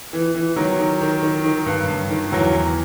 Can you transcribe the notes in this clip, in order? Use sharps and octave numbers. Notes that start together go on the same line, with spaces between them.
E3
E3
D#3 F#3
D#3
D#3
D#3
D#3
G2
G2
D#3
E2 F#3
E2